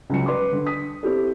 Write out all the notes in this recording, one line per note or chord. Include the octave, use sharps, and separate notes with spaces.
C#2 C#3 F#3 G#3 C#7
B4 C6 D6
D3
D#6 B6
C4 E4 G4 A4